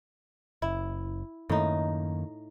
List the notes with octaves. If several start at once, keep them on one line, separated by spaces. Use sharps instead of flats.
F#1 E4
F#2 A2 D#3 A#3 D#4